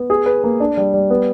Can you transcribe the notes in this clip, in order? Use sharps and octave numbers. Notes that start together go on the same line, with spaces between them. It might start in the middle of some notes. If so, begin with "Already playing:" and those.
Already playing: B3
G#4
B4
A#3
D4
G3
G3
B3